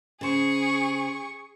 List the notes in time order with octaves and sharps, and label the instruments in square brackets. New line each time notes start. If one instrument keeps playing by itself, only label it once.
[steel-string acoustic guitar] C#3 C5 [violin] G#4 C#6